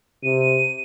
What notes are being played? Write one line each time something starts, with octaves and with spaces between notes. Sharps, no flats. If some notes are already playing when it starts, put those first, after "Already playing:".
C3 D#7